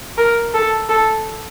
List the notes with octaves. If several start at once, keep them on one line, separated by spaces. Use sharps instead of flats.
A#4
A4
A4